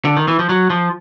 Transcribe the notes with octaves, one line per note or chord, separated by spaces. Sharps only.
D3
D#3
E3
F3
F#3
F3